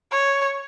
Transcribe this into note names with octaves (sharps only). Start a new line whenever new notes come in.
C#5